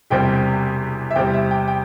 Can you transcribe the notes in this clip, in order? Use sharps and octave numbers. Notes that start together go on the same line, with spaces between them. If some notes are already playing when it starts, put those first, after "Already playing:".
E1 E2 C3 G3 C4 G5
E5
E2 C3 G3 C4 G5
E5
G5
G5